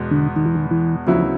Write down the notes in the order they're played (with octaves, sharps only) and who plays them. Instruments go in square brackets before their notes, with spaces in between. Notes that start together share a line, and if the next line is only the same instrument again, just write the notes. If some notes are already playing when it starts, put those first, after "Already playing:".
Already playing: [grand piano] E2 B2 G#3 B3
[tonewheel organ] D3
D#3
E3
D#3
E3
[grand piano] D2 C#3 F#3 B3 E4 [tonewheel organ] F3